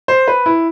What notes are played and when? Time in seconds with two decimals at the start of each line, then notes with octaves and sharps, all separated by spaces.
0.08 C5
0.28 B4
0.46 E4